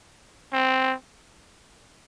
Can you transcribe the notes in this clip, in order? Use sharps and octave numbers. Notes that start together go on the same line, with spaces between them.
C4